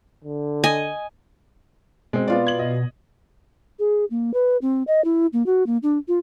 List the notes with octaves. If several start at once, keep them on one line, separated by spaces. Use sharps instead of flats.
D3
D#5 G#5
B2 G#3 C4
B3 F4 D5
G#6 F#7
D#5
G#4
A#3
B4
C4
D#5
E4
A#3
F#4
A#3
D4
F4